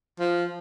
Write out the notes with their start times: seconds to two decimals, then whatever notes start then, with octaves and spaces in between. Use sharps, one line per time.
0.20 F3